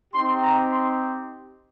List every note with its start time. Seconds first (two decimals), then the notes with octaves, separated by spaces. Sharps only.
0.13 C4 D#4 G4 C6
0.41 A#5
0.69 C6